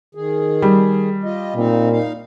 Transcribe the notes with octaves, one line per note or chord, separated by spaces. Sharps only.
D#3 G#4
G3
F4 D#5
A#2 C4 D#4
D#4 F5